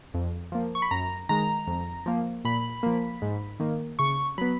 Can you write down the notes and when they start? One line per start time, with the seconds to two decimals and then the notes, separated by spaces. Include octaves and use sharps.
0.14 F2
0.52 F3 A#3
0.75 C#6
0.82 B5
0.91 F#2 A#5
1.29 D#3 G#3 A#5
1.67 F2
2.06 F3 A#3
2.45 A#2 B5
2.83 F3 A#3
3.22 G#2
3.60 D#3 A#3
3.99 C#3 C#6
4.38 F#3 B3 B5